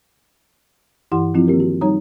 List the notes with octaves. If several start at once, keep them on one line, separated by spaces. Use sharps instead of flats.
G2 E3 E4 G4 F#5 C6
F3 C4 E4 F4
D#3 A#3 C4 G4 A#4
F#4
G3 D#4 C#5 A#5 D#6